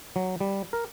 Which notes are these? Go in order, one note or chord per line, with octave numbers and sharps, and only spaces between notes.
F#3
G3
A#4